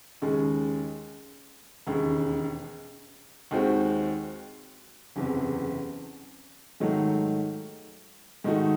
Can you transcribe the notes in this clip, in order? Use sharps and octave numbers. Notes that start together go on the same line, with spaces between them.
D#2 C#3 G#3
E1 D#2 C#3
D#2 D#3 G#3 C4 F#4
F#1 E2 C3
G#2 D#3 F#3 A3
G#2 D#3 A3 D#4 F#4